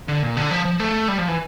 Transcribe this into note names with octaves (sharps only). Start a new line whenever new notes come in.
D3
A#2
D3
F3
F3
A3
G3
F3
E3